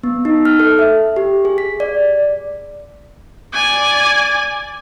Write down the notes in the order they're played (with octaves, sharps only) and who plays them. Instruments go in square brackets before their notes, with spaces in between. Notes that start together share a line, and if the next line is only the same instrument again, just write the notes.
[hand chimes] B3
D#4
F6
A4
E5
G4
G#4
B6
D5
[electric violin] D5 G#5